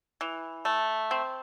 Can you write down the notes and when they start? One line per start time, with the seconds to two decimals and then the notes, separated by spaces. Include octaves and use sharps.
0.21 E3
0.65 A3
1.11 C4